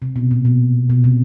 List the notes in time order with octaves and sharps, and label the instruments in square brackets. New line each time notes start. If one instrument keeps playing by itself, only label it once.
[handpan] C3
B2
A#2
B2
B2
C3